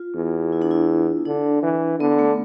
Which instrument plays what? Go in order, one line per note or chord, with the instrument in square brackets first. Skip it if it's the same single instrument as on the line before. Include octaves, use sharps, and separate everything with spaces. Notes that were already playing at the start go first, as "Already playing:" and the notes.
Already playing: [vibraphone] F4
[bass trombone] E2
[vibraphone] E4
D4
E4
[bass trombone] D3 [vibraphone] D4
[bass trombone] E3
[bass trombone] D3 [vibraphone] B3
[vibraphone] A3